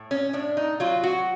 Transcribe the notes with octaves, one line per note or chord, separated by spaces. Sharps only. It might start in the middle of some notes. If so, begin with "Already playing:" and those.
Already playing: A2
C#4
A2 D4
D#4
F#3 F4
F#4